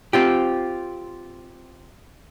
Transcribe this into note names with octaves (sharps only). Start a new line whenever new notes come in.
C4 F4 G4